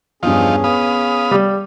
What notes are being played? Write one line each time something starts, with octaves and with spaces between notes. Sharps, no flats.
E2 G2 F3 C#4 D#4 F4 G#4
B3 F5 B5 D#6
G3